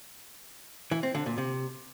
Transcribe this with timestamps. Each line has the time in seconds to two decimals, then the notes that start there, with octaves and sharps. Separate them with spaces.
0.91 E3
1.03 C4
1.15 D3
1.26 A#2
1.38 C3